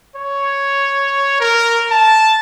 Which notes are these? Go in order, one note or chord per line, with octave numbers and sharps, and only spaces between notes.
C#5
A#4
A5